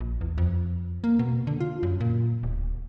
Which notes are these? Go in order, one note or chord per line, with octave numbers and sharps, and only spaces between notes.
A#1
E2
F2
A#3
B2
D3
F4
F#2
A#2
D1